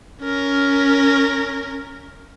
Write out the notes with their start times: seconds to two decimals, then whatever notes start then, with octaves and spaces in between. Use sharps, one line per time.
0.23 C#4 A#4